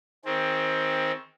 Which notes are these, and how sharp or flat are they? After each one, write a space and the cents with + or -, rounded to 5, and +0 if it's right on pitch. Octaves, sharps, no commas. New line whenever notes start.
D#3 +30 C4 +10 G#4 +5